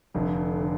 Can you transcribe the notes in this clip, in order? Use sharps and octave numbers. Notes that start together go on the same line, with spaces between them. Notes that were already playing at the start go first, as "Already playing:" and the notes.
F1 F2 D3
D3